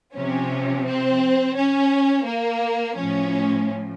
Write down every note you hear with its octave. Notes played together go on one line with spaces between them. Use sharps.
C3 F3 C#4
C4
C#4
A#3
A2 F3 C#4